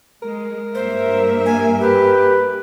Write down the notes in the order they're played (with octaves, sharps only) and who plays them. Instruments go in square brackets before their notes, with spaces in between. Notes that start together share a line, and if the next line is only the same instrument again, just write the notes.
[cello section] G#3 [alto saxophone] A#4
[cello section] G2 A#3 E5 [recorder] C5
[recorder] G#5
[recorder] G4 [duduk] B4